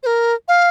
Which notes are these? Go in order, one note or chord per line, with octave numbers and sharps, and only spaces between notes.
C5
A#4
F5